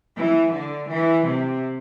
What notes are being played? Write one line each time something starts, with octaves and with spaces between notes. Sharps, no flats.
E3
D3
E3
C3